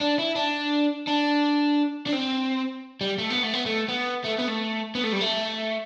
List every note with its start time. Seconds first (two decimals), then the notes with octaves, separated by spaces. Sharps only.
0.01 D4
0.19 E4
0.36 D4
1.07 D4
2.06 D4
2.12 C4
3.01 G3
3.18 A3
3.30 B3
3.43 A3
3.54 B3
3.66 A3
3.89 B3
4.25 A3
4.39 B3
4.48 A3
4.95 B3
5.04 A3
5.13 G3
5.21 A3